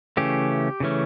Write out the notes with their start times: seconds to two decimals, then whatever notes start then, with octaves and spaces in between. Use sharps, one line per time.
0.17 C#3 E3 A3 C#4 G4
0.80 C#3 E3 A3 C#4